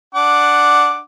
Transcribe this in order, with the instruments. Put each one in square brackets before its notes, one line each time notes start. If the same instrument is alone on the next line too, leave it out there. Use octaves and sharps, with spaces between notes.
[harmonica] D4 F#5 D6